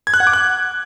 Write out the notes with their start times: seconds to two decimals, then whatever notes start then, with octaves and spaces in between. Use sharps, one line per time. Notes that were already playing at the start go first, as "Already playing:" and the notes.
0.07 G#6
0.14 F#6
0.20 F#5
0.27 D6
0.33 F#6